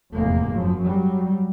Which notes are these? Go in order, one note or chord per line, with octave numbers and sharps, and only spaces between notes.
F1 E2 G#2 C3 A#3
F#2 F3
F#3 G3